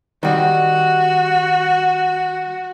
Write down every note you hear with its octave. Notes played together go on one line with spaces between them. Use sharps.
D#3 G3 F#4